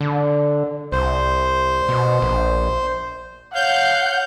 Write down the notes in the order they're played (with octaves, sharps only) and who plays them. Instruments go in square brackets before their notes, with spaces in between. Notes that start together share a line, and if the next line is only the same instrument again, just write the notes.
[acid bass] D3
[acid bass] C2 [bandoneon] C5
[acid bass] B2
A#1
[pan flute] C#5 [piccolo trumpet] F5 [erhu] F#5 [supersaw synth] G6